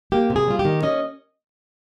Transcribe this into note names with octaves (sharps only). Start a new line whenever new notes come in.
A#3 G4
C3
G#4
G3 F4
G4
D#3
C#4 D#5